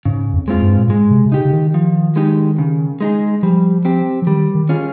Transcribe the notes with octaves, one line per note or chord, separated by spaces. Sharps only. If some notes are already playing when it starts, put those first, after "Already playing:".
G#2 C#3
F2
G#3 C4 F4
G2
A#2
G#2 G#3
C3
C3
C#3 D#4 G4
C#3
D#3
F3
G#3 D#4 G4
C#3
G#3 D#4 G#4
F3 G3
C4 G4
F3
D#3 G3
D#3
C#4 F4 G#4